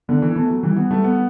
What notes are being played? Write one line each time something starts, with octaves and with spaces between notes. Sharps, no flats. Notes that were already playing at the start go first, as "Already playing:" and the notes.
D3 B3
E3
A3 B3
F#3
E3 G3
B3
G3 A3
B3